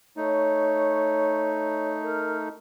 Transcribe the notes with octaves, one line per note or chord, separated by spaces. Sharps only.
A3 D#4 C#5
A#4